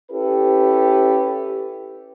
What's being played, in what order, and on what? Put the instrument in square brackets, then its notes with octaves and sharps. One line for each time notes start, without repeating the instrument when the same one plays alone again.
[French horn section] C#4 E4 G4 A4 B4